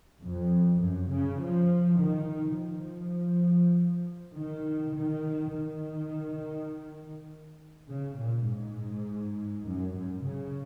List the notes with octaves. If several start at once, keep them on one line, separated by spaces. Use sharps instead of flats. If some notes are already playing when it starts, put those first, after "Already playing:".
F2
F#2
C#3
F3
D#3
F3
D#3
D#3
D#3
C#3
A#2
G#2
F#2
F#2
C#3